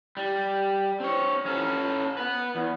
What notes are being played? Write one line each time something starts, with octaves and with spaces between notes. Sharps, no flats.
G3
C4 C#5
C#4 A4
B4 F#5
E2